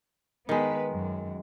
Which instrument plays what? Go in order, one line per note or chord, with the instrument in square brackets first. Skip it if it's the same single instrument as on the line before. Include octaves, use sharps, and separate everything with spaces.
[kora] D#3 G#3 [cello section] B3 B4
[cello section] F#2